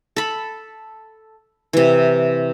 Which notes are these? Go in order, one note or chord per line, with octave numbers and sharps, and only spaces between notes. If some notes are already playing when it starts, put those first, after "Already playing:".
A4 B5
C3 E3